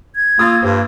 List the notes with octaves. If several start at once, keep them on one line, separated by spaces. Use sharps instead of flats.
G#6
A#3 F4 D#6 E6 A6
G2 G4 C5